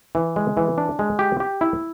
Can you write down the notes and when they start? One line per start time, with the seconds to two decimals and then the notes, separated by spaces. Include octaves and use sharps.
0.15 E3
0.36 G#3
0.57 E3
0.78 D4
0.99 G#3
1.19 G4
1.40 G4
1.61 E4